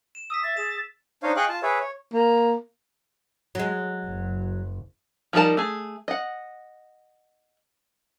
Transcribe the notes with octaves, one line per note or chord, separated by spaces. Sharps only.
E7
D#6 E6 B6
E5 A6
G#4 E7
D4 D#4 C5 C#5 D#5 F5
G#4 D#5 F5 G5 C#6 F#6
F4 A5
G#4 B4 C#5 E5
C#5
A#3
F#3 G#3
F#1
F3 G3 D#4 A#4 A5
A3 G#4
D#5 F#5